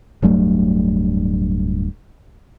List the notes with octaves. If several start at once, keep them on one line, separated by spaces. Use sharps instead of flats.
D1 G2 F#3 A3